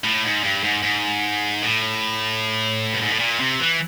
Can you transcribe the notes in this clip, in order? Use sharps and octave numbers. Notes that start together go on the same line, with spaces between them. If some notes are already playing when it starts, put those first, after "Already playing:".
A2
G#2
G2
G#2
G#2
A2
G2
G#2
A2
A#2
C3
E3